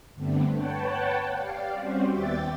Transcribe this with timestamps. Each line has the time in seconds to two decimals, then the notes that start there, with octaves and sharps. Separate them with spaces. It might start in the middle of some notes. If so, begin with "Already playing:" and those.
0.14 G2 D3 A3 B3 C4 D4
0.52 B4 C#5 F#5 G5 A5
1.34 G4 D5 F5
1.72 G3 C4 C#4 F#4 C5
2.07 D#2 B3 D5 E5 G5 A6